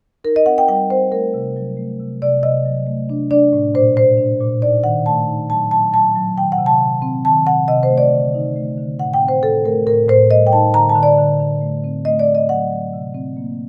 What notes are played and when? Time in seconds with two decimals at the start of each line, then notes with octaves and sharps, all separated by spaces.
0.24 D#4 A#4
0.36 D#5
0.46 C4 F#5
0.58 G5
0.68 G3 G5
0.90 C4 C5
1.12 A3 A#4
1.34 C3
1.56 F#3
1.77 A3
2.00 C3
2.22 C3 D5
2.43 C3 D#5
2.65 F#3
2.87 A3
3.09 D4
3.31 D4 D5
3.53 A2
3.74 A#2 C5
3.97 D4 C5
4.18 D4
4.40 A#2
4.62 D#4 D5
4.83 D#3 F#5
5.06 A3 A5
5.28 D#4
5.49 F#3 A5
5.71 F#3 A5
5.93 F#3 A5
6.15 F#3
6.37 D#3 G5
6.52 F#5
6.58 C3
6.66 A5
6.80 D#3
7.02 C4
7.25 D#3 A5
7.46 C3 F#5
7.68 C3 D#5
7.83 C5
7.89 A3
7.98 D5
8.12 D3
8.34 D#4
8.56 A3
8.78 D3
8.99 A2 F#5
9.14 G5
9.21 C4
9.28 C5
9.43 A2 A4
9.64 A3 A#4
9.87 A2 A#4
10.08 A2 C5
10.30 G3 D#5
10.47 G5
10.53 D#4 A5
10.74 D3 A#5
10.89 A5
10.96 D3
11.03 D5
11.18 D3
11.40 D3
11.62 A3
11.84 C4
12.05 A3 D#5
12.19 D5
12.28 A3
12.35 D#5
12.49 F#3 F#5
12.72 F#3
12.93 C3
13.14 C4
13.37 A#3